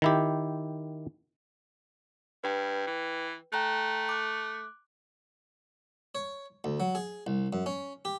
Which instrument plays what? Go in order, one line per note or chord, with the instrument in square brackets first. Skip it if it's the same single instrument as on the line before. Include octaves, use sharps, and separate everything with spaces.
[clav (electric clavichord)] D#3 E4 G4
[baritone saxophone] G2 [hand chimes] B4 G5
[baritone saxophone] E3
[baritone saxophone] A3 [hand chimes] G5 A#5 F#6
[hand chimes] D6 F#6
[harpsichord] C#5
D2
F#3
G#4
C2
F#2
C#4
G4